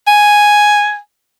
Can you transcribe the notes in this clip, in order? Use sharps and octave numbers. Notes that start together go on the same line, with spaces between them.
G#5